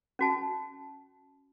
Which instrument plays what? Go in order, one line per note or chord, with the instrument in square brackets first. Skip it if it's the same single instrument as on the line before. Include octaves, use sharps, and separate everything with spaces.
[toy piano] C#4 F#4 A5